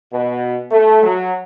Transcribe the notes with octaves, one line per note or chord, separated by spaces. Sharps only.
B2
A3
F#3